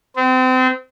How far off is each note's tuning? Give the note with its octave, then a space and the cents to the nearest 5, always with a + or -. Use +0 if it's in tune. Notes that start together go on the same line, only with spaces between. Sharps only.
C4 -30